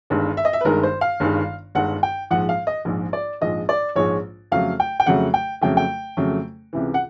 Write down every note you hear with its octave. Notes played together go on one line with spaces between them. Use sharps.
G1 G2 D#3 G#3
E5
D#5
E5
B4
G1 G2 D#3 G#3 A#4
C5
F5
G1 G2 D#3 G#3
G1 G2 D#3 G#3 F#5
G5
A#1 G#2 F3 G#3 F#5
F5
D#5
A#1 G#2 F3 G#3
D5
A#1 G#2 F3 G#3 D#5
D5
A#1 G#2 F3 G#3 C#5
F2 C#3 F#3 A3 F5
G5
G5
F2 C#3 F#3 A3 F#5
G5
F2 C#3 F#3 A3 G5
G5
F2 C#3 F#3 A3
C#2 C3 E3
F#5